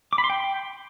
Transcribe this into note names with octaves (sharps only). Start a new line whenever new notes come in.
D6
B5
C6
G5